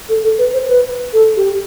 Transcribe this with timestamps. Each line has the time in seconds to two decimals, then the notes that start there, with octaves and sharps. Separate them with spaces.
0.09 A4
0.23 A4
0.38 B4
0.53 C5
0.68 B4
1.13 A4
1.37 G4